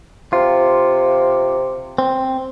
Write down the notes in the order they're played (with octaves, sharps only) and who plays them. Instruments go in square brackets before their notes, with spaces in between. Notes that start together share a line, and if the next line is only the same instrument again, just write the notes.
[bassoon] C3 [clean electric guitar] F4
[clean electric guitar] C4